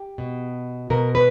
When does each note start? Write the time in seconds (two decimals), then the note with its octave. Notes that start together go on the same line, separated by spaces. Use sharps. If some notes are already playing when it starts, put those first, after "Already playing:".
Already playing: G4
0.18 B2
0.90 B2 A#4
1.15 B4